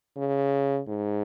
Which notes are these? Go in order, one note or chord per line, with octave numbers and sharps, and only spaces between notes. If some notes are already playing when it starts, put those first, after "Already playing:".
C#3
G#2